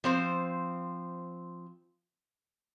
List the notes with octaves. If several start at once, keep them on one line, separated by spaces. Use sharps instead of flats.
F3 C4 C5